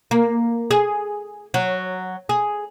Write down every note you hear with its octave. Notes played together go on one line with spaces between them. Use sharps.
A#3
G#4
F#3
G#4